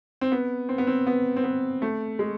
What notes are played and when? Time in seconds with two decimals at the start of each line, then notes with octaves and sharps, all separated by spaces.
0.21 C4
0.32 B3
0.69 C4
0.78 B3
0.87 C4
1.07 B3
1.36 C4
1.44 B3
1.82 A3
2.19 G#3